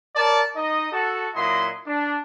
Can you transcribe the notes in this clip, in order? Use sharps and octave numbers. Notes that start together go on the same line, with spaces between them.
A#4 C#5 D5 A5
D#4 D#5
F#4 A4
A#2 F#3 E4 D#5 C6
D4